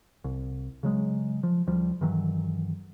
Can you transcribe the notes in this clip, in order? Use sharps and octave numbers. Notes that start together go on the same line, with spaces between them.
C2
C#3 F#3 G#3
F3
D2 F3 G3
G2 D#3 E3 F#3